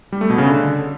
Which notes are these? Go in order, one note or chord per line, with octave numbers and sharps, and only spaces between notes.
G3
A3
B2
C#3
D3